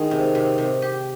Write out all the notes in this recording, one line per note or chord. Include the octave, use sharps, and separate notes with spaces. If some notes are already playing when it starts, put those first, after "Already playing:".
Already playing: D#3 G#3
C3
C3
C3
G4